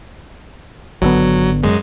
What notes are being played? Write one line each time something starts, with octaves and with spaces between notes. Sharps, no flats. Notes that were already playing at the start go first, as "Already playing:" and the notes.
G#1 D3 F#3 B3
F#2 G#3